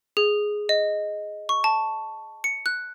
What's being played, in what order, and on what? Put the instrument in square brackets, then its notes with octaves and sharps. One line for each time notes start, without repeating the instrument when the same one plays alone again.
[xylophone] G#4
D#5
C#6
A5
C#7
F#6